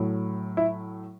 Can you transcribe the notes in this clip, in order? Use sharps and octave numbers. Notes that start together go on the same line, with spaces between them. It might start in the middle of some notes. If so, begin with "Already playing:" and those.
Already playing: A2 F#3
E4